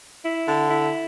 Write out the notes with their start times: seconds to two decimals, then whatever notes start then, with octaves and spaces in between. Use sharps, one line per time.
0.24 E4
0.47 D3
0.70 E4